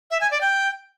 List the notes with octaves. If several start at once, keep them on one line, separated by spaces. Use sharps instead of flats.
E5
G#5
D5
G5